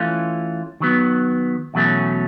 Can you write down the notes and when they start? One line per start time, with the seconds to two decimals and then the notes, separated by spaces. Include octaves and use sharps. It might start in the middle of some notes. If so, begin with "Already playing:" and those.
Already playing: E3 A3 C#4 F4
0.80 D#3 F#3 B3
1.74 E2 B2 F#3 A3 C#4